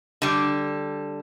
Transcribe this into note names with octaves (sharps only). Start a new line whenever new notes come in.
D3 G3